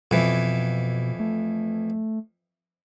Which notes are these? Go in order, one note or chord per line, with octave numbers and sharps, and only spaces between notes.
F2 B2 E3
A3